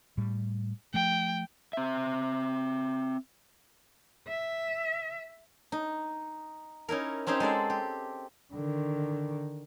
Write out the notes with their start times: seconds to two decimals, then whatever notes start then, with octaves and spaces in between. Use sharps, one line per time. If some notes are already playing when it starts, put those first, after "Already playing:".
0.17 A2 G3
0.94 F3 A3 G5
1.73 C4 E5
4.28 E5
5.72 D#4
6.88 C#4 D#4 E4 A#4
7.27 C4 C#4 D#4 G4 C5 C#5
7.40 G#3 A4 C5 D5
7.70 G4
8.53 D3 D#3